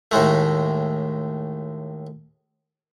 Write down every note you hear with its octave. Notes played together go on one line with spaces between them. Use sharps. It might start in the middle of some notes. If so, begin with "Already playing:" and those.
D#2 A2 G#3 A3